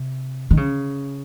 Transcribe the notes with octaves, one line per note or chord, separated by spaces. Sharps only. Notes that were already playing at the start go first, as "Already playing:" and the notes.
Already playing: C3
D#3
C#3